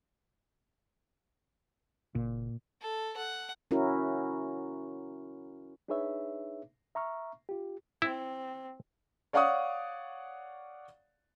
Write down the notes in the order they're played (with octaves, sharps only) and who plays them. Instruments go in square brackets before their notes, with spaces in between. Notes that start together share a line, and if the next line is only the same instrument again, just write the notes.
[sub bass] F#1 [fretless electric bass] A#2
[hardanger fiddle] A4
F#5
[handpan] C#4 E4 F#4 A#4
[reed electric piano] D4 D#4 G#4 B4 C#5 E5
E5 A#5 C#6 F6
F4 G4
[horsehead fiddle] C4 [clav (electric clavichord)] E4
[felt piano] C#5 D5 F5 F#5 C#6 D#6